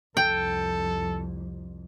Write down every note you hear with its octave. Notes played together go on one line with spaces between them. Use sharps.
C2 F2 A4 G5